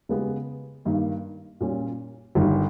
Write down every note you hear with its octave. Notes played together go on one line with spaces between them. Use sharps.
C#3 G#3 B3 G4
G2 D#3 A#3
A#2 G3 C#4
G1 G2 D#3 G3